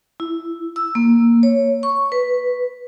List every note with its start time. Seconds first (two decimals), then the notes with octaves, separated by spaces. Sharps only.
0.20 E4
0.76 E6
0.95 A#3
1.43 C#5
1.83 C#6
2.12 B4